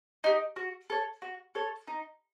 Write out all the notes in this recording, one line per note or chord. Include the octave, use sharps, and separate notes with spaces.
D#4 G4
F#4
A4 C#5
F#4
A4 C#5
D#4